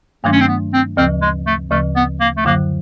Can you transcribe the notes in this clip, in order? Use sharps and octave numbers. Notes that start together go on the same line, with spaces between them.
G2 D#3 F#3 A3 A#3 D4
C#4
C4
B3
C4
D2 C#3 F3 C4
G#3
A3
D2 C#3 F3 A3
B3
A#3
A3
F#2 D3 F#3 A#3